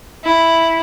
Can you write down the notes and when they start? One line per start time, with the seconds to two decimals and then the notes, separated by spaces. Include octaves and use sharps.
0.24 E4